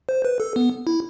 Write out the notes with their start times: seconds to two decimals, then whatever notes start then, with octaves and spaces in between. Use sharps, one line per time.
0.09 C5
0.25 B4
0.40 A4
0.56 B3
0.87 E4